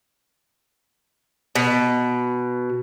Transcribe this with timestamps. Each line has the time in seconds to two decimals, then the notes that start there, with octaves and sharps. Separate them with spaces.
1.55 B2